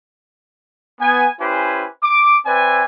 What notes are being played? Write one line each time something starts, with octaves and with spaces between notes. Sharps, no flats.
B3 G#5
C#4 E4 G4 B4 C5 G#5
D6
C4 B4 D5 E5 G#5